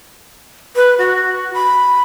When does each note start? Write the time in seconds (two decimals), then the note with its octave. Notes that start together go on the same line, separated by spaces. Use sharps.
0.76 B4
0.98 F#4
1.54 B5